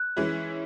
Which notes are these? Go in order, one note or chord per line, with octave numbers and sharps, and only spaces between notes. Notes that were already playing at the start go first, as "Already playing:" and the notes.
Already playing: F#6
E3 G#3 C#4 E4